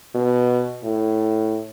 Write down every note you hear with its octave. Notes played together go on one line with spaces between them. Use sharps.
B2
A2